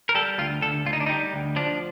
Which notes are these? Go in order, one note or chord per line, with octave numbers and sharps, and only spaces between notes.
A#4
G3 A4
D2 F4
D2 A4
D2 F4
D#4
D4
G3 D#4
D2
F3 D4